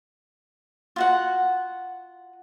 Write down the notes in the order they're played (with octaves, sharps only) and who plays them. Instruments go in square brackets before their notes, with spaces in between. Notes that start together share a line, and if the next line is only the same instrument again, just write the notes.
[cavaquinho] F4 F#4 F#5